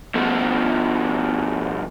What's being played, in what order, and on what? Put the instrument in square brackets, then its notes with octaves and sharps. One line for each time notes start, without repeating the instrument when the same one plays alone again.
[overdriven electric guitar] B2 F3